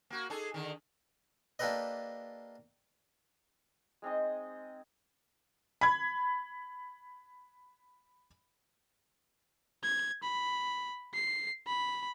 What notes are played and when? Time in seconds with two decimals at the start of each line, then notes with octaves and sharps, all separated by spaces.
0.10 A#3 F#4
0.30 D#4 G#4 A4
0.54 D3 D#3
1.59 A#3 D4 G4 A4 B4 D#5
4.02 G#3 C4 D#4 D#5
5.81 B5 G#6
9.83 G#6
10.23 B5
11.14 C7
11.67 B5